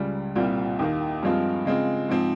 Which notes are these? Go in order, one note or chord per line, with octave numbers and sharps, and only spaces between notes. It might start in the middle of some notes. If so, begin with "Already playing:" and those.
Already playing: C#2 C#3 G3
C2 A#2 G3 C4 F4
D#2 D#3 A#3
G2 F3 G#3 C4 F4
C#3 G#3 C4 F4
G#2 F3 C4